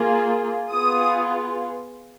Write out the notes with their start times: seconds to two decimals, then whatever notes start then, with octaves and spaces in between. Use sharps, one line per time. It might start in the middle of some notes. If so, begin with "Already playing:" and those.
Already playing: A#3 F4 G#4
0.72 B3 F4 G#4 D#6